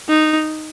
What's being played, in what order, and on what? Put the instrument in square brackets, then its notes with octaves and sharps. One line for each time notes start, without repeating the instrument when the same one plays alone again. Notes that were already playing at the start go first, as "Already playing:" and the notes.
[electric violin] D#4